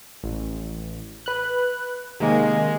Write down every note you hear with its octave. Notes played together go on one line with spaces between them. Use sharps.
A1
B4 F#6
C3 D#3 G#3 A#3